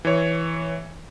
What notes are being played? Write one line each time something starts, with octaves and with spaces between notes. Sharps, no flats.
E3 C#5